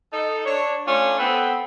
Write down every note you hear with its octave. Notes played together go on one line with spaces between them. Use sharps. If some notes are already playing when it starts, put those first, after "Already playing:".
D#4 A4
D4 C#5
A3 C#4 D4 F4
B3 C4 A4 B4